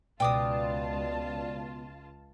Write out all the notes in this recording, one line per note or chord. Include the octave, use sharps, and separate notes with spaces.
C#2 B2 F4 D5 G5 A5 D6 D#6